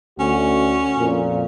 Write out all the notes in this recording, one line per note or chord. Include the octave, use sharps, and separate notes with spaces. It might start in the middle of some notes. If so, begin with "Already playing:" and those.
D2 C#4 F#4
F2 A#2